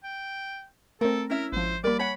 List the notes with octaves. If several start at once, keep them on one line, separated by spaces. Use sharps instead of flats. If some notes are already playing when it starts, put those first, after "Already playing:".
G5
A3 C4 A4 A#4
C#4 E4 A#4 E5
G#1 F3 C5
G3 A#3 A#4 D5 B5
C#5 F#5 G#5 B5 F#6